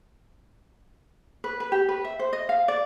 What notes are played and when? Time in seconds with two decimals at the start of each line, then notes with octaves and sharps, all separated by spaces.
1.44 B4
1.60 B4
1.72 G4
1.89 B4
2.04 E5
2.19 C5
2.33 D#5
2.49 F5
2.68 D5